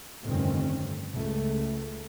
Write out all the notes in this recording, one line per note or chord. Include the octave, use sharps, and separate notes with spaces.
F1 G2 D3 D#3 C4 C#4
C#2 A3